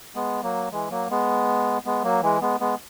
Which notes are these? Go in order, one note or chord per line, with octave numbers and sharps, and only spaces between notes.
G#3 B3
F#3 A#3
E3 G#3
F#3 A#3
G#3 B3
G#3 B3
F#3 A#3
E3 G#3
G#3 B3
G#3 B3